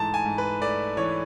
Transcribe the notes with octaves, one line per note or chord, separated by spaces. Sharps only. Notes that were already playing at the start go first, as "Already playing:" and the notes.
Already playing: G#2 E3 A3 A5
G#5
G#2
B4
A3 D5
E3 C#5